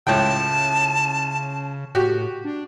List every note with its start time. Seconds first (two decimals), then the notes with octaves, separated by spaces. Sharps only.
0.07 C#2 A2 C#3 G5 A5
1.95 A2 F#4 G4
2.45 D4